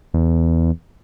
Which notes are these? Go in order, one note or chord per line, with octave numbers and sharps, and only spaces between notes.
E2